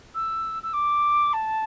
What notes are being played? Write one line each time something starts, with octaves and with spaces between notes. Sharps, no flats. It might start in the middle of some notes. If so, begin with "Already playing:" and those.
E6
E6
D6
A5